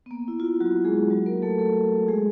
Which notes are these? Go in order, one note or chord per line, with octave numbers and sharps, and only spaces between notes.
B3
A#3
E4
F4
E4
F#3 F#4
G#3 G#4
F#3 F#4
A#3 A#4
A3 A4
A3 A4
G#3 G#4